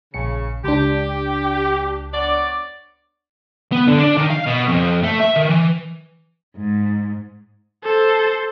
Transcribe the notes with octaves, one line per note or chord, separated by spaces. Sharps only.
A#1 C#3 C#7
C#2 D4 G4
B3 C#5 D5
B3
D3
D4
D#3
F5
B2
F2
A3
E5
D#3
E3
G#2
A4 C5